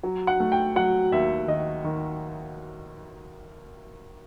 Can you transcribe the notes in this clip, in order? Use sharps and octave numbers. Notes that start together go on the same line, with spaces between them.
F#3
F#5
A3
G5
F#3 F#5
D#2 E5
D#3 D#5
D#3